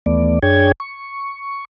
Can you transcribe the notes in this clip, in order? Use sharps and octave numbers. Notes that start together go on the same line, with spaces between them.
D#2 E3 A3 B3 D5
F#2 D4 G#4 C#5 G5 G#6
C#6